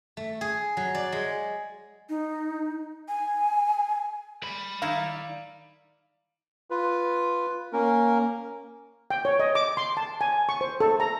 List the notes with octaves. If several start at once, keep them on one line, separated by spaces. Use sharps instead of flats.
A3
G#4
F#3
D5
G#3
D#4
G#5
D5 B5
D#3 D#4 E4 F5
F4 B4
A#3 C#4 A#4
G5
C#5
D#5
D6
C6
A5
G#5
C#6
C5
A4
A#5